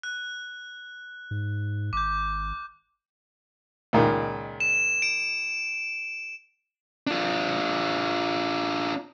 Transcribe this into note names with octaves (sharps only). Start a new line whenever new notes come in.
F#6
G#2
G#1 D6 G6
C#2 A#2 D#3
E7
D7
D4 F4